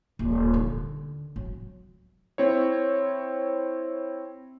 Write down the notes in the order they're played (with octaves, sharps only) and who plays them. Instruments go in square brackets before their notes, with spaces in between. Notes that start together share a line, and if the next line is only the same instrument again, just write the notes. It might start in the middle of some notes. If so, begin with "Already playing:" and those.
[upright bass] D#1
D3
F#3
[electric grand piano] C4 E4 C#5